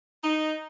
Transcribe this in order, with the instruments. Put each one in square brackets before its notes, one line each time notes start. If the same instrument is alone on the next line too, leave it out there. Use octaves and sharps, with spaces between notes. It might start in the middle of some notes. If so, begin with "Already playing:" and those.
[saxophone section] D#4